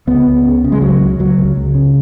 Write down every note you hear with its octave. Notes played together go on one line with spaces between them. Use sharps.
C#2 B3
C#2
C#3
C#3
G#3
C#2 F#3
C#2
C#2 F#3
C#2
C#2
C#3